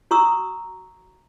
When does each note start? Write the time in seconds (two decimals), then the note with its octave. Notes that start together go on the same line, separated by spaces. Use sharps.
0.11 F#4 A#5 C#6 D#6 E6